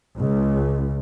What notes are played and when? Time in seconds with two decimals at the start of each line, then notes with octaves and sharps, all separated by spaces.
0.16 C#2